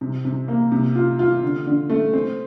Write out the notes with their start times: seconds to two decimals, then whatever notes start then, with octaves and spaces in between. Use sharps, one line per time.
0.01 C3
0.25 C3
0.48 A#3
0.72 C3
0.95 F4
1.19 F4
1.43 D3
1.66 D3
1.90 A3
2.13 C4